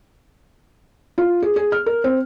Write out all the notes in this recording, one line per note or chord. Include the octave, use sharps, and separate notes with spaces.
F4
G#4
G#4
F6
A#4
C4